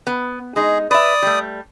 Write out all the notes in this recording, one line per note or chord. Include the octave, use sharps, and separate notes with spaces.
B3
G#3 D#4 G#4
B4 D5 E5 D#6
G3 A3